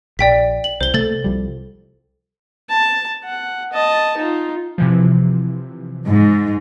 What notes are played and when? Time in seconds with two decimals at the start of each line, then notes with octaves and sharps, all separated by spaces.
0.19 A#1 D5 G5 B6
0.64 F#7
0.81 C2 C5 G7
0.94 C3 A3 A#3 A4 A6
1.24 C2 F3 G3
2.69 A5
3.24 F#5
3.72 D#5 A5
4.17 D#4 F4
4.78 C3 E3 F3
6.06 G#2